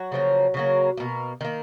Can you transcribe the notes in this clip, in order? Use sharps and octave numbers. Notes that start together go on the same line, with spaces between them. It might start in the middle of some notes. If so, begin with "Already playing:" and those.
Already playing: F#3 F#4
C#3 F3 A#3
C#3 F#3 A#3
B2 A#3
D#3 A#3